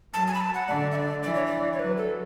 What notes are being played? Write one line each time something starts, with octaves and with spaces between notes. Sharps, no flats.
F#3 A5
G#5
B5
A5
F#5
D3 D5
E5
D5
E3 D5
C#5
D5
C#5
F#3 B4
A4